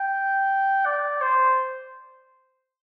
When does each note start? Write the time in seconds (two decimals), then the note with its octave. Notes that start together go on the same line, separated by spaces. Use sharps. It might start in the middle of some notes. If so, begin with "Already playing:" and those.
Already playing: G5
0.86 D5
1.21 C5